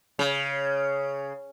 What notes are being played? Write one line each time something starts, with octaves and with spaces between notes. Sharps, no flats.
C#3